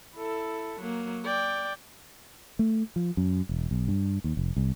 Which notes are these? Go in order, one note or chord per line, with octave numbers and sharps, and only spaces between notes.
E4 A4
F#3 A#3
D5 G5
A3
F3
F#2
E1
B1
G2
D#2
F1
C2